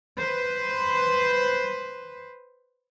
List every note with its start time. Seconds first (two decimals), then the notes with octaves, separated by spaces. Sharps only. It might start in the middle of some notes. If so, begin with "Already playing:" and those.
0.18 B4 C5